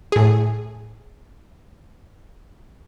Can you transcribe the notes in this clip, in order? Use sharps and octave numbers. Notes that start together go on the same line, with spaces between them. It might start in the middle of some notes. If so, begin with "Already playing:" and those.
A2 G#4